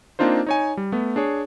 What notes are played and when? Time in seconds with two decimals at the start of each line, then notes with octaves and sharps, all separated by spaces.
0.19 A#3 C4 D4 D#4 F4 C5
0.47 D#4 C#5 G#5
0.77 G3
0.92 A3 B3
1.16 D4 G#4 C#5